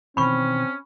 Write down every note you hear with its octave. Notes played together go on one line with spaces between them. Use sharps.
B2 D#3 E3 C4 C#4 B5 C#6